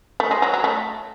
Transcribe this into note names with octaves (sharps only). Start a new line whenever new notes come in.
A3
G#3
F#3
F#3
A3